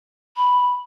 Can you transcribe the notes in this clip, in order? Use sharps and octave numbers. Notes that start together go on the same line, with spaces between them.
B5